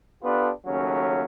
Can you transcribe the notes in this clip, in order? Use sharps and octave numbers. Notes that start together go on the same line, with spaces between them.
B3 D4 F4 G4 A4 B4
D#2 C#3 F#3 A3 C#4